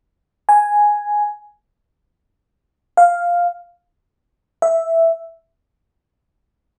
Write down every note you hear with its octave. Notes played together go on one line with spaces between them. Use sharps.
G#5
F5
E5